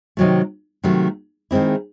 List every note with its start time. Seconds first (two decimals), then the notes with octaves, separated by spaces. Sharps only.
0.17 C3 D#3 F#3 A3
0.84 C3 D#3 F#3 A3
1.51 D#3 G#3 C4 E4